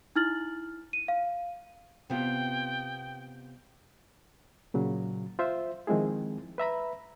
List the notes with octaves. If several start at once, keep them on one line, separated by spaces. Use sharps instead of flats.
D#4 E4 F6 A6 F#7
D#7
F5
C3 B3 F4 G5
A#2 C#3 F#3
F4 C5 E5
D#3 F3 G#3 C4 E4 G#4
B4 E5 A#5 B5